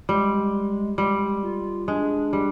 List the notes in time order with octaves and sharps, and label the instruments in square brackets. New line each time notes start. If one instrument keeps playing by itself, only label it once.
[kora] G3 [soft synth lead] G#3
[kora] G3 [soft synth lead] G#3
[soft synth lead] F4
[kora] G#3 [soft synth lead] D4
[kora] G3